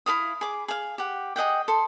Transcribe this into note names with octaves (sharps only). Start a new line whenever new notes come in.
E4 A4 F5 D#6
G#4 D6
G#4 F5
G4 F#5
G#4 D#5 F#5 G5
A4 C6